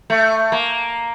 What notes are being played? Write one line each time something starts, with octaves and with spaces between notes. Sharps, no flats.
A3
A#3